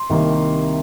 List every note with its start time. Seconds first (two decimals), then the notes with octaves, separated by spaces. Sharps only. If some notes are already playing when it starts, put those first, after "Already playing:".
Already playing: C6
0.10 C2 C3 D#3 A#3